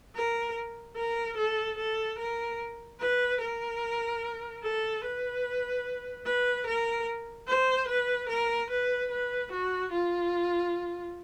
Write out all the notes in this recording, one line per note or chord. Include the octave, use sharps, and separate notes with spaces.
A#4
A#4
A4
A4
A#4
B4
A#4
A4
B4
B4
A#4
C5
B4
A#4
B4
B4
F#4
F4